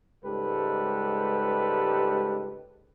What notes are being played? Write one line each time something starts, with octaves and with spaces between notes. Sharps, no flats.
C#2 G#2 G3 G4 A4 B4